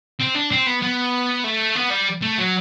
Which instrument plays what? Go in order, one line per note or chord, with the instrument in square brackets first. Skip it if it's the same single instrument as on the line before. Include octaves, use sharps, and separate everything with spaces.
[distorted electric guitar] C4
D4
C4
B3
B3
A3
B3
G3
A3
F#3